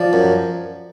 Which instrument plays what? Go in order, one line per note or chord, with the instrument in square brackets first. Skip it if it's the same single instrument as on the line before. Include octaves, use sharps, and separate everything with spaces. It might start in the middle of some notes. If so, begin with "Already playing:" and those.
Already playing: [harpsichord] F3 [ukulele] D5
[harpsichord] F#2